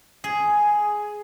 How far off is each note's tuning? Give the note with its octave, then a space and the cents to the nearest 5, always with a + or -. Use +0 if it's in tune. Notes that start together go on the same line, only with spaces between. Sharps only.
G#4 +5